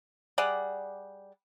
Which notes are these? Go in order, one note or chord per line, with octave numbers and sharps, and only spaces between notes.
G3 G#4 D5 F#5